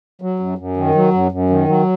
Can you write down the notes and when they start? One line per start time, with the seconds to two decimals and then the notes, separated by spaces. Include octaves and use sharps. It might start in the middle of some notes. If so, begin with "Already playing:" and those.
0.22 F#3
0.39 F#2
0.58 F#2
0.77 D#3
0.95 F#3
1.13 F#2
1.32 F#2
1.50 D#3
1.68 F#3